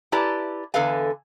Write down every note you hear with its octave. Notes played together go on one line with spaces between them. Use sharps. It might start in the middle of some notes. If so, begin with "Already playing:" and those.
E4 G4 B4 D5 A5 A#5
E2 D3 A4 B4 F5 G#5